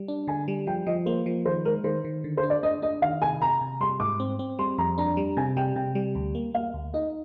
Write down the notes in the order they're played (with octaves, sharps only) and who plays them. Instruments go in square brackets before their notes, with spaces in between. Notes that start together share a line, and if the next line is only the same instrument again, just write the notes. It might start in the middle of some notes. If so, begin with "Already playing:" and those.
Already playing: [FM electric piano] G3
D4
[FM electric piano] D3 [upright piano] G#5
[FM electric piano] G3
[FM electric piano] F3 [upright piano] G5
[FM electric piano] F3 [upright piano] D#5
[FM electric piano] A#3 [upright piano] C5
[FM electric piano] F3
[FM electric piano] D#3 [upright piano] C5
[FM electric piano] G#3 [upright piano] A#4
[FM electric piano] D#3 [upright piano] C5
[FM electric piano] D#3
D3
[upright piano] C5
[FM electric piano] D4
[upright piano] D5
[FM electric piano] D4 [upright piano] D#5
[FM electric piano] D4 [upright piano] D#5
[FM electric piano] D#3 [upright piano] F5
[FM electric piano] C3 [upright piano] G#5
[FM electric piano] C3 [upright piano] A#5
[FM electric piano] C3
[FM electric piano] G3 [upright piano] C6
[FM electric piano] G#2 [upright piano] D6
[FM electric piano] C4
C4
[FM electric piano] G3 [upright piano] C6
[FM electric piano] F2 [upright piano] A#5
[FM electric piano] D4 [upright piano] A#5
[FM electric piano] G3
[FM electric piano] C3 [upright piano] G#5
[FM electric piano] G3 [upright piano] G5
[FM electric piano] C3 [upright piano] G5
[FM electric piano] G3
D2
A#3
[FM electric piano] A#3 [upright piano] F5
[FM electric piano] D2
[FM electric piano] D#4 [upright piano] D#5